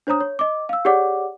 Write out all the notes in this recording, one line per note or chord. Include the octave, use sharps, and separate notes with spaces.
D4 C5 C#5 A#5 D#6
C#5
D#5 D6
F5 E6
G4 G#4 C#5 D5 F#5 D6